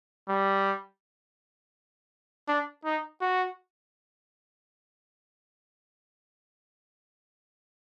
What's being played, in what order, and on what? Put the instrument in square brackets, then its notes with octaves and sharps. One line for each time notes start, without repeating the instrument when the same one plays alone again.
[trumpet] G3
D4
D#4
F#4